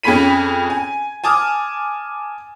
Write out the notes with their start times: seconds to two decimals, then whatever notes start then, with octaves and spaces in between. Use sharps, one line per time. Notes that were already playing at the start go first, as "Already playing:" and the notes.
0.03 F2 C#4 G#4 B5 B6 D#7
0.70 G#5
1.24 G#5 A5 D6 D#6 F6